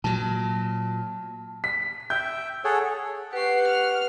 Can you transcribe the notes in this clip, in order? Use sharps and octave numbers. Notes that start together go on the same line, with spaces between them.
A#2 F#3 A5
B6
E5 G5 G6
G#4 A4 C#5 F#5
G4 B4 F#5 C#6 C7
F6